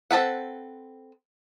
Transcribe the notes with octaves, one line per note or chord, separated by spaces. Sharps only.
C4 A4 B4 F#5